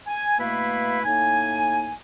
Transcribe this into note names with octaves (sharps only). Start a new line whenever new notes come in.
G#5
B2 A3 A#3 E4 B4 F5
A2 A#3 D#4 G#5